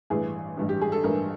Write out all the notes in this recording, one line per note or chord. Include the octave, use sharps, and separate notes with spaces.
A1 G2 E3 G#4
A1 G2 E3
G4
G#4
A4
A1 G2 E3 A#4